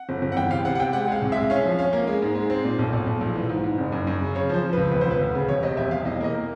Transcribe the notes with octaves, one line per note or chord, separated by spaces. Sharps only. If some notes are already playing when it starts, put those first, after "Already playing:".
Already playing: F#5
G1
G1
F#5
E2 G5
C3 F5
C3 F#5
F#5
C3 G5
G#3 F#5
G#3 F5
C2
G#3 E5
C#4 F5
F3
C#4 F5
A#3
G#3
G#2
G#3
C4
A#2
B1
B1
B1
A#1
E3
G#2
G#2
F#1
F#2
F#2
C#3
C#3 C#5
F3 C5
F3
C#2 B4
E1 B4
C5
E1 B4
D2
C#3
E1 C#5
C3 D#5
E1 E5
E1 F5
E2 D#5
A#3 D#5
A#3